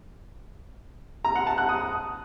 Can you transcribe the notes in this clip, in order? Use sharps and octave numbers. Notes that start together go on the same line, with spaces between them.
A#5
F#5
A5
F#6
D#6